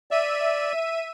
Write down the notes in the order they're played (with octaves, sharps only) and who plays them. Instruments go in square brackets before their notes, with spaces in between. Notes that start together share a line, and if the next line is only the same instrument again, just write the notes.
[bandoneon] D5 [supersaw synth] E5 D#7